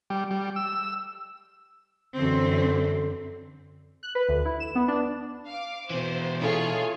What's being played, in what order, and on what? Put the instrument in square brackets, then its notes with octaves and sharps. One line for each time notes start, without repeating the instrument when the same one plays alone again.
[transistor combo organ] G3
G3
E6
[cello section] F#2 E3 C4 [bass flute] D3
[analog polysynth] F#6
B4
D2
E4
E7
B3
D4
[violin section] F5 D6
[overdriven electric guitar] B2 E3 [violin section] C5
[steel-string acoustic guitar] E4 A4 [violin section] F4 G#4 C#5